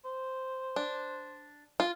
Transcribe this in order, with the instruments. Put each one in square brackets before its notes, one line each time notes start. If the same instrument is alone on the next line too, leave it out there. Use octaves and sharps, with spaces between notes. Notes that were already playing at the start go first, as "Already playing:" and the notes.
[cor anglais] C5
[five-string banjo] D4
F4